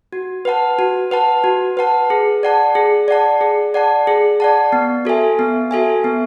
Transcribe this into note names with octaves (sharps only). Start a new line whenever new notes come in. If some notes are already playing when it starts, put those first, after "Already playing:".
F#4
B4 F#5 A5
F#4
B4 F#5 A5
F#4
B4 F#5 A5
G#4
D5 F#5 A5
G#4
D5 F#5 A5
G#4
D5 F#5 A5
G#4
D5 F#5 A5
B3
F#4 A4 E5 G#5
B3
F#4 A4 E5 G#5
B3